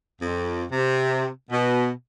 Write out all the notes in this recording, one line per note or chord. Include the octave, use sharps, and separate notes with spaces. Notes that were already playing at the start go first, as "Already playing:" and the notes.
F2
C3
B2